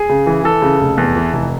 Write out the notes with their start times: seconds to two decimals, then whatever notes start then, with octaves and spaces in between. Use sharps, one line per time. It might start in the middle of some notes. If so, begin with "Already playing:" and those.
Already playing: G#4
0.09 C#3
0.26 E3
0.44 E3 A4
0.62 C#3
0.81 F1
0.98 E2
1.16 E3
1.33 F1